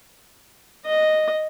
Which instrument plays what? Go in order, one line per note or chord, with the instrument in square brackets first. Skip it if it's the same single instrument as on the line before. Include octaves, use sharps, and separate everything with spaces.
[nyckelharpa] D#5